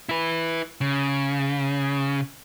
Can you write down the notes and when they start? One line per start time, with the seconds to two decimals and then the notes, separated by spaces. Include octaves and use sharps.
0.09 E4 B4
0.81 C#3